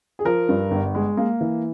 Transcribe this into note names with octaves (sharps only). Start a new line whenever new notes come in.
G#4
F3 A#4
G2
G1
G#3
A#3
E3